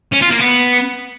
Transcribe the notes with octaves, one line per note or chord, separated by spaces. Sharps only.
C#4
F4
A#3
B3